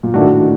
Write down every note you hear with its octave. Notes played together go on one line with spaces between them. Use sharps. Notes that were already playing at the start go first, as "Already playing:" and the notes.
A#2
A2 D#3 A3 D4 F#4